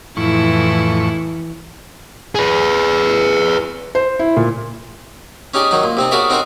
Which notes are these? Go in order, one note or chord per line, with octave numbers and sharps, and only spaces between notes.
F2 A2 E3 E4 C#6
G#4 B4
C5
E4
A#2
C#4 D#4 G4 G#4 D5
D#3 F#3 D#4
A#2
C3 C4 D#4
F#4 G#4 A#4 C#5 D5 E5
C4 D#4 F#4 A#4 C5 C#5